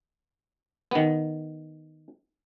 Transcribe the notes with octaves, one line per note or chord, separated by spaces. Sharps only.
D#3 B3